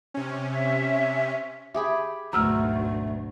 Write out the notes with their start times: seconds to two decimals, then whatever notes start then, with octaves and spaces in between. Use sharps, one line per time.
0.14 C3 C#4
0.52 E5
1.74 G4 G#4 E5 B5
2.33 G#1 D2 B2 F#3 A3 A#5 E6 F6